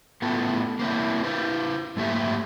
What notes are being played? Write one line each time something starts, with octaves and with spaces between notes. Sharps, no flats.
A2 A3 B3 F4 A5
A#3 C4 E4
E4 B4 C5
G#2 F#3 A3 A#3 G4 E5